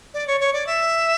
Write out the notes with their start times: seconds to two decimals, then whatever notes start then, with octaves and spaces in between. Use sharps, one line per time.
0.14 D5
0.27 C#5
0.41 C#5
0.53 D5
0.66 E5